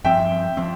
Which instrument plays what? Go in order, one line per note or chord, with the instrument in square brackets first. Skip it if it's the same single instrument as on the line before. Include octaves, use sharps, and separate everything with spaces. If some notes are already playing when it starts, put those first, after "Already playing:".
[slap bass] G2 F3 C4 [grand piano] E5 G5
[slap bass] F3 C4